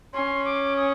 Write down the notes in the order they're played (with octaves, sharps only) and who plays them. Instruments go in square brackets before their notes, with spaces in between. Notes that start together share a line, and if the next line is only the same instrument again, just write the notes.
[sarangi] C#4 [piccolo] C6
[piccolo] D6
D#6